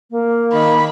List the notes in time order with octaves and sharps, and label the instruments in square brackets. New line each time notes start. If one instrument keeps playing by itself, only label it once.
[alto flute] A#3
[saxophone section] D#3 [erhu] B5